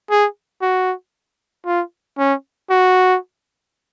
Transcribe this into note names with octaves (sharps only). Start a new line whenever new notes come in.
G#4
F#4
F4
C#4
F#4